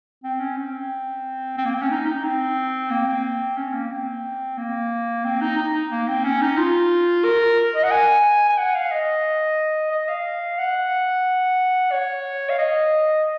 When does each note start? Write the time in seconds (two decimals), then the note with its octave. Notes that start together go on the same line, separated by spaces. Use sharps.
0.24 C4
0.40 C#4
0.57 C4
1.58 C4
1.66 A#3
1.74 C4
1.82 C#4
1.91 D#4
2.07 D#4
2.24 C4
2.90 A#3
3.08 C4
3.57 C#4
3.74 A#3
3.91 C4
4.58 A#3
5.24 C4
5.41 D#4
5.58 D#4
5.91 A#3
6.08 C4
6.25 C#4
6.41 D#4
6.58 F4
7.24 A#4
7.75 D#5
7.83 F#5
7.91 G#5
8.50 G#5
8.58 F#5
8.75 F5
8.91 D#5
9.91 D#5
10.09 F5
10.58 F#5
11.92 C#5
12.49 F5
12.58 D#5